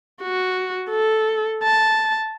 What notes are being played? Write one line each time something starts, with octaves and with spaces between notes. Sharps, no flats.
F#4
A4
A5